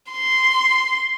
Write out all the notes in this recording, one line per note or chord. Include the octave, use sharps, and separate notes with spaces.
C6